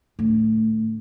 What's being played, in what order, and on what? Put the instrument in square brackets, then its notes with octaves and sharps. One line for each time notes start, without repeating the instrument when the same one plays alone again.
[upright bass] A2 D3